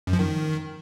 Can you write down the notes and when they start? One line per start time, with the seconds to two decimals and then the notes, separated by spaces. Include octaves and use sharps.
0.07 F#2
0.13 F3
0.19 D#3